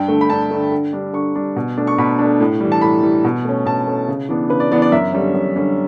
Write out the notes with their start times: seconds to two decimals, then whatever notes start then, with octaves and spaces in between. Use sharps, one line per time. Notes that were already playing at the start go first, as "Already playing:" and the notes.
Already playing: G2 G5
0.08 D3 A3
0.21 B5
0.30 G2 A5
0.51 D3 A3
0.72 D3
0.93 G3 D4
1.13 D3 C#6
1.35 G3 D4
1.56 B2
1.77 A3 D4
1.87 C#6
1.98 B2 B5
2.19 A3 D4
2.41 A2
2.60 E3 G3
2.72 A5
2.81 A2 B5
3.02 E3 G3
3.24 B2
3.45 A3 C#4
3.66 B2 A5
3.87 A3 C#4
4.08 C#3
4.29 E3 B3 D4
4.50 C#3 B4
4.60 D5
4.72 E3 B3 D4 D5
4.82 D5
4.92 F#2 E5
5.13 D3 G3 C#4
5.34 F#2
5.56 D3 G3 C#4